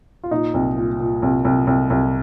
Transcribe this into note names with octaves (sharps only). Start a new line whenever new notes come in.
F4
A#2 D#4
C2
A#2
A#2
C2
C2
C2
C2